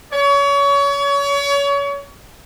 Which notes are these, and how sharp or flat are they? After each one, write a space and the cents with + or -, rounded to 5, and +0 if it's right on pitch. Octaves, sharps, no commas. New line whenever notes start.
C#5 +30